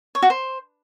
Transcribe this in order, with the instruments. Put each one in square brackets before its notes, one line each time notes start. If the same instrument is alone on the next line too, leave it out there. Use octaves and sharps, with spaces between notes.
[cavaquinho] C#5
F#4
C5